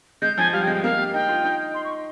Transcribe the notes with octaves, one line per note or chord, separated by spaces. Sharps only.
G#3 G6
F3 G#5
G3 F5
G5
G#3
G5
A#3 F5
G4
D#4 G5
F4
D#4
C6
C#6